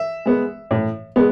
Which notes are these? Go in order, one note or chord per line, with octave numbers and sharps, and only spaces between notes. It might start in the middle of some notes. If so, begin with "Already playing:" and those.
Already playing: E5
G#3 B3
A2
G#3 B3